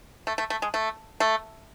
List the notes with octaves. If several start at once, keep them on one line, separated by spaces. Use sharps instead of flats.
A3
A3
A3
G#3
A3
A3